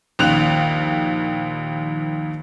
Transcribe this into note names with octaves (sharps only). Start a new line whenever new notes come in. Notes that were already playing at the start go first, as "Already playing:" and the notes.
A#1 D#2 F#6 F7